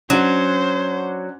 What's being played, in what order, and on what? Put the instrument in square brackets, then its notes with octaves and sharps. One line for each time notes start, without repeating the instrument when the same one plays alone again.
[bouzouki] F#3 [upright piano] C#4 D4 F#4 [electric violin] C5